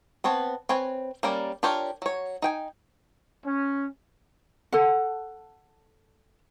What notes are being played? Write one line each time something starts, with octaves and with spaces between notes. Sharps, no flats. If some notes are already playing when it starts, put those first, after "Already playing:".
B3 C4 C#5 A5
C4 B4 C#5 G#5
G3 A#3 C#4 A#4 D5
D4 F4 G4 A#4 C#5
F#3 C#5
D#4 G5 G#5
C#4
A4 F#5